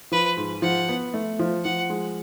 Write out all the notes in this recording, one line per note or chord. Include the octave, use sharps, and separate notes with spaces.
F3 B4
G#2
F3 F#5
B3
A3
F3
F3 F#5
G#3